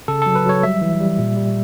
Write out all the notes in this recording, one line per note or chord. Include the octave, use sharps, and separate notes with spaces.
C#3 A4
F#3 A4
B4
F#3 C#5
G3 E5
E3
G3
A#2
G3